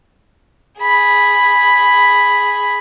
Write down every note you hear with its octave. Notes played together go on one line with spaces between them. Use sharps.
G#4 B5